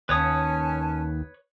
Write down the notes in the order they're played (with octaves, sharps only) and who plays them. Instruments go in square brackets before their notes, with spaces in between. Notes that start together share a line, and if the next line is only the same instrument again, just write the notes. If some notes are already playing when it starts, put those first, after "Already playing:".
[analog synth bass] D#2 [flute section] C#4 G#5 A5 [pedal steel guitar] B4 C#5 D#6